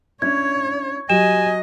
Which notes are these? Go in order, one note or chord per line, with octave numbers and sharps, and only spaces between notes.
C#4 D4 E4 C#5 G#6
F#3 G4 D#5 G#5 E7